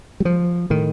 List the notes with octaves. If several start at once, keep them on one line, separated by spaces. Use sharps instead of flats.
G3
F3
A2 D#3